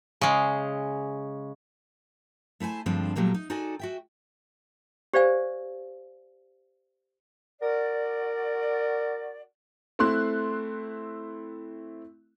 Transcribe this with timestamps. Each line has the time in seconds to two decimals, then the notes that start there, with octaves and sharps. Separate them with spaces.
0.21 C#3 G#3
2.60 A3 E4 C5 G#5 A5
2.86 G2 D3 F3 G#3 C4 D4
3.16 A#2 F#3 G3 A3 A#3
3.34 D#4
3.50 D#4 F#4 A4 D5 G#5
3.79 F#4 E5 G5
5.13 G4 C5 D5 F5 G#5
7.61 F#4 A#4 D5
9.99 A3 C4 E4 C6 F#6